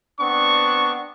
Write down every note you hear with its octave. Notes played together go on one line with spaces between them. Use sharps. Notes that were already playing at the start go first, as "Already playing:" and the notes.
B3 C4 D4 C#6